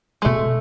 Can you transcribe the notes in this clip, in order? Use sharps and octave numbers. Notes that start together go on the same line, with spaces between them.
G#3
B2 A3